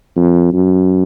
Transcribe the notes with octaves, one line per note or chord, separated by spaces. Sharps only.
F2
F#2